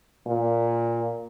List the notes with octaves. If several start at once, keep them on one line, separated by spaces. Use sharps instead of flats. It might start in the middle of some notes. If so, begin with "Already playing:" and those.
A#2